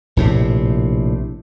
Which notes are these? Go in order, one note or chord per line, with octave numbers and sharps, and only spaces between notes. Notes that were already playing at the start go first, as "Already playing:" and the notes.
A#1 A2 C3